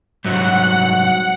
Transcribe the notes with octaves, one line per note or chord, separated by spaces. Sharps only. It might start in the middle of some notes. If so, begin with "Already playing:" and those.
C2 G#2 F#3 F#5